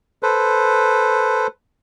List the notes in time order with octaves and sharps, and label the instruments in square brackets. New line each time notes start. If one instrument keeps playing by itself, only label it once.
[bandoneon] A4 B4 C5